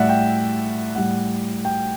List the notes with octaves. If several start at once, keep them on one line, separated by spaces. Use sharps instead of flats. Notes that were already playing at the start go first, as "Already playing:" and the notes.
Already playing: A2 G3 D5 E5 F#5
G5
A2 G3 F#5
G5